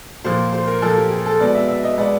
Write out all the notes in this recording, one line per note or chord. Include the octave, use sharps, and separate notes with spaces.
A#2 F3 A#3 C5
C5
A#4
A#2 F3 A#3 A4
G4
G#4
A4
B2 G#3 B3 D5
E5
E5
D#5
B2 G#3 B3 D5